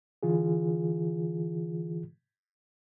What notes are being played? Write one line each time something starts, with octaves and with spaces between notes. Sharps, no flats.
D3 E3 F4 G#4